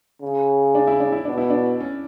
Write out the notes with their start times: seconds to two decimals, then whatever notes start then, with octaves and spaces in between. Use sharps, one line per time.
0.22 C#3
0.75 D4
0.87 E4
1.00 D4
1.12 E4
1.25 B2 D4
1.38 E4
1.50 D4
1.80 C#4